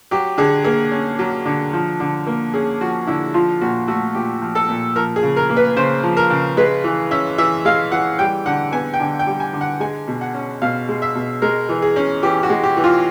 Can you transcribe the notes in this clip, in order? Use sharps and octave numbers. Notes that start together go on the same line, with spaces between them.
F#3 G4
D3 G#4
A#3 G#4
C#4
F#3
D3
F3
D3
A#3
C#4 G#4
F3 F#4
D3 E4
F3 F4
A#2 F#4
A3 F#4
A#2 G4
F3
A4
A#2
F3 A#4
G#4
C#3
A#4
A#3
B4
C#3 C5
F3
A#4
C#3
G#3 B4
E3
C#4 E5
E3 E5
G#3 F5
E3 F#5
G3 G5
D3 F#5
B3 G#5
G5
D3 G#5
G5
G3
G#5
D3
F#5
G#3 G#5
B2
F#5
C#4
B2 F5
G#3
E5
B2
G#3 A#4
E3
G#4
C#4
E3 G4
F#4
G#3
G4
E3
F4